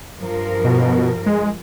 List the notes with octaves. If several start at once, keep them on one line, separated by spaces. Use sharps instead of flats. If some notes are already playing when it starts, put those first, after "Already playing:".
G2 F3 A#4
B2
G#3